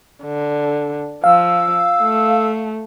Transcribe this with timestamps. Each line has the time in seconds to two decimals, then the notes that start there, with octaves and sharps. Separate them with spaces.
0.24 D3
1.24 F3 F5 E6
2.01 A3